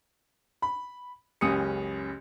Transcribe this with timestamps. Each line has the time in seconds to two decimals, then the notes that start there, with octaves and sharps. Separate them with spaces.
0.62 B5
1.41 F#1 C#2 C#4 G4 D#6 C#7